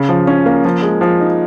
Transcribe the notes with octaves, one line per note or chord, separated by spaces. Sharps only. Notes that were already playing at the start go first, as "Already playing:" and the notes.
Already playing: C#3
F3
C#4
A#3
F3
G#3
F3
D#4